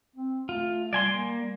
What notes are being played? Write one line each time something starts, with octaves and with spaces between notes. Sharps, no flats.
C4
A3 F4
G3 D5 G#5 C6
A#3